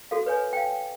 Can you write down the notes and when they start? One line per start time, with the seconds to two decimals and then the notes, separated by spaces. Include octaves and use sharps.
0.11 F#4 A4 F5
0.26 B4 C#5 G#5
0.53 F5 G5